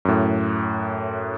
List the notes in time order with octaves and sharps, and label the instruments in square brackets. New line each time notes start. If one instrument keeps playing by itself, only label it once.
[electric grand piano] F#2 A2